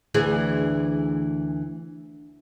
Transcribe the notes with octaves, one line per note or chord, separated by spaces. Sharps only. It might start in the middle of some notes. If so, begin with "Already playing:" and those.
D2 E3 G#4